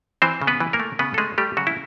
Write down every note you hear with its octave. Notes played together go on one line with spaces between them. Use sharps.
E3 C4 C5
C#3
B3 B4
E3
A#3 A#4
A3
C#3 B3 B4
A4
G#3 A3 G#4
G3 A3 G4
C#3 F#3 F#4
E4